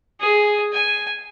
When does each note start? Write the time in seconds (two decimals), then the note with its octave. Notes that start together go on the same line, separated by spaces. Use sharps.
0.20 G#4
0.73 G#5